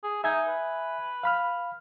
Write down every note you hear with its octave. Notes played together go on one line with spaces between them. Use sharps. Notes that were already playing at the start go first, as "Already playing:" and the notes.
G#4
D#4 E5 G#5 G#6
B4
F5 B5 F6